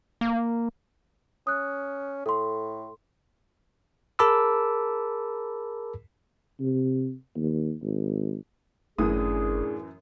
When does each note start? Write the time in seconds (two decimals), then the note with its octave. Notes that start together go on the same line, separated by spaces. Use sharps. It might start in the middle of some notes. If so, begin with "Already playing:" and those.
0.21 A#3
1.47 C#4 D#6 F#6
2.26 A2 A4 C6
4.19 G#4 A#4 A5 B5 D6 E6
6.60 C3
7.36 D#2
7.82 G#1
8.98 G1 F#2 A2 E3 C#4 D4 G#4 D#6